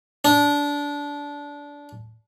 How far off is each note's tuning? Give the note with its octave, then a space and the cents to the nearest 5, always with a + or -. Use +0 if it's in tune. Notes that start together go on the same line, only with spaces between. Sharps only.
D4 -20